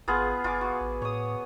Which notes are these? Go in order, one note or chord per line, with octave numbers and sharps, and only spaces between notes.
G#1 B3 F4 G#4
G1 F4 G#5 D6
F#4
A1
A2 C#5 D#6